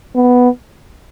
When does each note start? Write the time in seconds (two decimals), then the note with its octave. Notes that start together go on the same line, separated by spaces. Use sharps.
0.16 B3